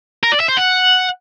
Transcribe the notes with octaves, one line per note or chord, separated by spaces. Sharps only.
A#4
D5
E5
C5
F#5